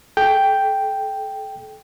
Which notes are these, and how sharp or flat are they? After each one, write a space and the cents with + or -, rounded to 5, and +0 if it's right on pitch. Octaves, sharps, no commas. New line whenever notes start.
A4 -35 G5 +0